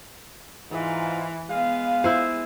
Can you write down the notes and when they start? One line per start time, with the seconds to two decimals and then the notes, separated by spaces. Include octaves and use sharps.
0.71 G#2 E3 F4
1.48 G#3 B3 F5
2.04 E4 C5